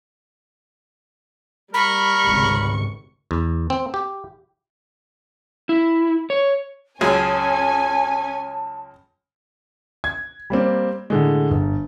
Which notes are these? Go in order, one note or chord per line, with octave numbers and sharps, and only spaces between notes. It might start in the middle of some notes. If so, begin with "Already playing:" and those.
G3 A#4 B5 C#6
G#1 C#2 C3
E2
C4
G4
E4
C#5
C#2 F#2 C#4 G#4 G#5 A5
G#6
G3 A#3 C4
A2 D3 G#3
G1